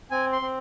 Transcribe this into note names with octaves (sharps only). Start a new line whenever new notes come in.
C4 G#5
C6
C4